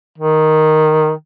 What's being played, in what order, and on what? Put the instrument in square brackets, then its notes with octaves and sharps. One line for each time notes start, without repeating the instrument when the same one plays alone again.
[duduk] D#3